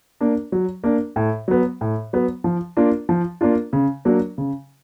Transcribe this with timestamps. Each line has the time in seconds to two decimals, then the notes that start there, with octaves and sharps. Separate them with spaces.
0.21 A#3 D4
0.52 F#3
0.84 A#3 D4
1.16 A2
1.48 F#3 B3
1.81 A2
2.13 F#3 B3
2.44 F3
2.77 A#3 D4 F4
3.09 F3
3.41 A#3 D4 F4
3.73 C#3
4.05 F#3 A#3 D4
4.38 C#3